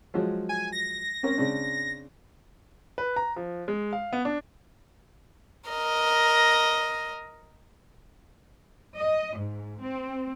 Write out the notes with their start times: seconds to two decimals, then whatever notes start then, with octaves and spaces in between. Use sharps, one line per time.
0.14 F3 F#3 G#3
0.49 G#5
0.72 A#6
1.23 C4 C#4 A#4
1.38 C#3 C4 D4
2.98 B4
3.16 A#5
3.36 F3
3.68 G#3
3.93 F5
4.13 B3
4.25 D4
5.69 A#4 D#5
8.96 D#5
9.36 G#2
9.79 C4